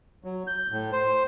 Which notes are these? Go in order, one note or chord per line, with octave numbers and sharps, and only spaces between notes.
F#3
G6
A2
C5